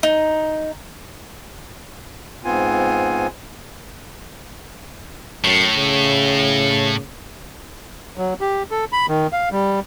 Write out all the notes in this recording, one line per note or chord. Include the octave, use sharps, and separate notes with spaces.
D#4
G#2 B3 C4 F4 G#5
F#2 A2
C#3
F#3
G4
A4
B5
D#3
F5
G3